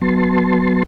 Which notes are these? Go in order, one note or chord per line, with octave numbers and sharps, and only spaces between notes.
F#3 B3 A5 C6